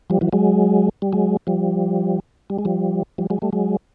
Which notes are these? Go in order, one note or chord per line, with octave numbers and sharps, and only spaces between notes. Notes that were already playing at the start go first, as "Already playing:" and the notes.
F3 G3
E3 F#3
F#3 G#3
G3
F#3 G#3
F3 G3
G3
G#3
F3 G3
F3 G3
F#3 G#3
G3 A3
F#3 G#3